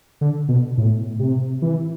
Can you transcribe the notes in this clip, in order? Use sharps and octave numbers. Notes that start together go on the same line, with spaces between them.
D3
B2
A2
C3
E3